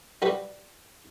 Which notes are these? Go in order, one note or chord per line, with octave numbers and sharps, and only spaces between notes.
G3 F#4 B4